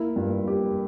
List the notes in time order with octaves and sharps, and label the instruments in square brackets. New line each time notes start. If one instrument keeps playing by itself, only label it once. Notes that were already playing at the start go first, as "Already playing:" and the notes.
Already playing: [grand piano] A#3 E4
G2 F4
A#3 G4